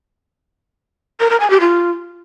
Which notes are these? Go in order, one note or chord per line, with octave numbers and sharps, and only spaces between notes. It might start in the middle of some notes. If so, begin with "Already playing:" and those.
A#4
A#4
G#5
G4
F4